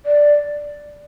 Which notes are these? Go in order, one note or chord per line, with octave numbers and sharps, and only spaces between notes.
D5